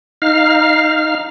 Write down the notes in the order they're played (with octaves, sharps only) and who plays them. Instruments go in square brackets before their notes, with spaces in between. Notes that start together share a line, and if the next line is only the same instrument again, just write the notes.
[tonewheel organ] D#4 F5 F6